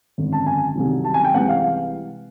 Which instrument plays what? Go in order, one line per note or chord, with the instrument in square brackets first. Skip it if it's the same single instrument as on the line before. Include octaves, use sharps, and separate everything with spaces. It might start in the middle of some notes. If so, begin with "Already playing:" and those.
[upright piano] G#1 F#2 D3
A5
G#5
C2 C3 D#3 F#3
A5
G#5
G5
C2 C3 E3 G#3 F#5
F5